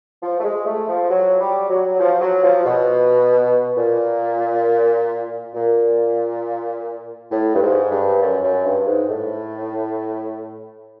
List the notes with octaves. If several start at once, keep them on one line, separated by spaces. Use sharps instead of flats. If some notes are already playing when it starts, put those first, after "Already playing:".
F3
A3
G#3
A3
F3
F#3
G3
F#3
F3
F#3
F3
B2
A#2
A#2
A2
G2
G#2
G2
F#2
F#2
G2
G#2
A2